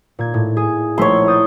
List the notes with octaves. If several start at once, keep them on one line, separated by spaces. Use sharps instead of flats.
A#2 G#6
A2
G#4
A#1 A3 E4 C#5 C6
D#6 G6 A6